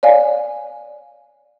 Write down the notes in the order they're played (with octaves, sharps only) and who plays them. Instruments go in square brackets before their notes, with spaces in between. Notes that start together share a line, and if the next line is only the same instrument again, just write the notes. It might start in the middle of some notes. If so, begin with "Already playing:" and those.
[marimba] C#5 D5 F5 G#5